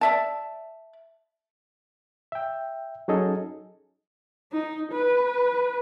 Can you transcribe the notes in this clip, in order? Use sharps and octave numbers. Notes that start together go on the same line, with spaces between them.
D5 E5 A5
E5 G5
F#3 C#4 D#4 G#4 A4 D#5
D#4
B4